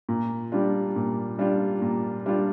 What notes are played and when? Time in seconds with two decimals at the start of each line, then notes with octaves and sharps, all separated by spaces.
0.09 A#2
0.52 G3 D4 F4
0.96 A#2
1.38 G3 D4 F4
1.82 A#2
2.26 G3 D4 F4